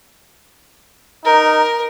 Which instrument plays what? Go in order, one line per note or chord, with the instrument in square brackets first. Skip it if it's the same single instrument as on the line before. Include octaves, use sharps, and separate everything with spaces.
[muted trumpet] D#4 [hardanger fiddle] A#4